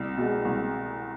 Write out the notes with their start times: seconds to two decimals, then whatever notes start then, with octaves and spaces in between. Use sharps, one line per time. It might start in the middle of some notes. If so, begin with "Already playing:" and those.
Already playing: C2
0.17 B2 G#3
0.45 C2